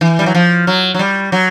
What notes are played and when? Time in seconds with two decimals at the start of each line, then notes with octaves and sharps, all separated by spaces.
0.01 E3
0.19 G3
0.26 F#3
0.35 F3
0.67 F#3
0.95 F#3
0.99 G3
1.32 F#3